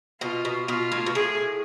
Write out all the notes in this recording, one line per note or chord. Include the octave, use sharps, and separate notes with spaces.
B2 F4
B2
B2 F4
A2
B2
A2 G#4